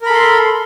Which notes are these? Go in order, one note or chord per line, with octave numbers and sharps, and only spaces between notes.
A4 A#4 B5 C6